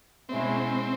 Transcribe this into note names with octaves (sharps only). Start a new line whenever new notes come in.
B2 G#3 C4 C#4 E4